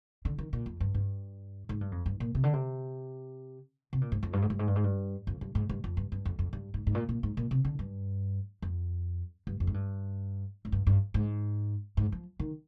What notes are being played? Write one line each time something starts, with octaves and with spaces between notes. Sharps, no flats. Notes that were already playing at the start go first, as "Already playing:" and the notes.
D3
D#3
A#2
F2
G2
G2
G#2
G2
F2
G2
A#2
C3
D3
C3
C3
A#2
G#2
F2
G2
G#2
G2
G#2
G2
G#2
G2
F2
G2
G#2
G2
F2
G2
G2
F2
F2
G2
G#2
G#2
A#2
A#2
G#2
A#2
C3
D3
G2
F2
G2
F2
G#2
G2
G#2
G2
G2
G#2
G#2
F3
D#3